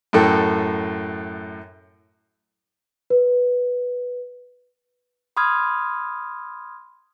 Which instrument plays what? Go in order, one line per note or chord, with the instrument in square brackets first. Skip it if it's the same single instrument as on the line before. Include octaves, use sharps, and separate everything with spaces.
[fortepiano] F#2 A2 A4 G5
[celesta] B4
[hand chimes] B5 C6 D#6 F6 G#6